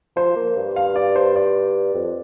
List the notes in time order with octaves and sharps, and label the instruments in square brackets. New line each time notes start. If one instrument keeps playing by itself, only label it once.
[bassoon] F3 [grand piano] C5
[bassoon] A#3
G2
[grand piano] F5
D5
C5
D5
[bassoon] F2